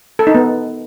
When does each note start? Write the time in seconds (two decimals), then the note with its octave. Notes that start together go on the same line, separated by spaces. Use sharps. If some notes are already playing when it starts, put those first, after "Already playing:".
0.19 A4
0.27 D#4
0.35 B3